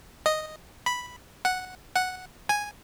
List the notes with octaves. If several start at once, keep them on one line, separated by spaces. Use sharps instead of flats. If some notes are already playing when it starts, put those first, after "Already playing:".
D#5
B5
F#5
F#5
G#5